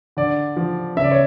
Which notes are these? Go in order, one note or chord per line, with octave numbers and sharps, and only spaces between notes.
D3 D5
F3
C#3 E5
D5
C#5